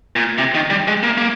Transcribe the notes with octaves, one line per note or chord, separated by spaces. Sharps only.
A#2
C3
D#3
G3
G#3
A#3
A#3